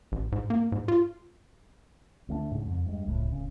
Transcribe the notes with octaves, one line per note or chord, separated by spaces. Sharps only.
A1
G#2
A#3
G#2
F4
D2 A3 A#3 D4
G#2 C#3
F2
G2 G#3
D1 C#2 A2
D1 C#3